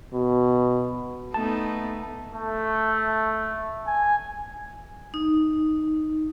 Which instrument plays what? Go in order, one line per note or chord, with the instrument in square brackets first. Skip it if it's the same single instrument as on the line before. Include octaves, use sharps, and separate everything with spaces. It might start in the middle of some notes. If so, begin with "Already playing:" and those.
[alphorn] B2
[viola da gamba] A3 B3 D#4 [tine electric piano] A5
[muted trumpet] A3
G#5
[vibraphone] D#4